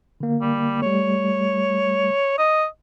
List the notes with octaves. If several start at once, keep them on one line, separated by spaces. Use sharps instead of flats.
D3 A#3
G3
G3 A3 C#5
D#5